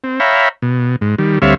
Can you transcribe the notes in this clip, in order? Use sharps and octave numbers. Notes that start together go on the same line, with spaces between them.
C4
C#5 E5 F5 G5 A#5 B5
B2
G#2
D#3 G3
D2 G3 C4 C#5 E5 F5